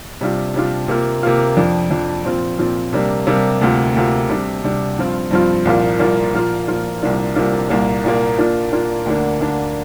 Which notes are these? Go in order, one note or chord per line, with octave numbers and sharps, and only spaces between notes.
C3 G3 D4 F4
C3 G3 D4 F4
C3 A#3 F4
C3 A#3 F4
F2 F3 D4
F2 F3 D4
A#2 F3 C4 F4
A#2 F3 C4 F4
C3 G3 A#3 D4
C3 G3 A#3 D4
D2 C3 A#3 F4
D2 C3 A#3 F4
C3 G3 D4
C3 G3 D4
G2 F3 C4 F4
G2 F3 C4 F4
C2 A#2 F3 A#3 F4
C2 A#2 F3 A#3 F4
A#2 F3 A#3 F4
A#2 F3 A#3 F4
C2 C3 A#3 D4 F4
C2 C3 A#3 D4 F4
C2 A#2 A#3
C2 A#2 A#3
A#2 A#3 D4 F4
A#2 A#3 D4 F4
D2 D3 A#3 D4
D2 D3 A#3 D4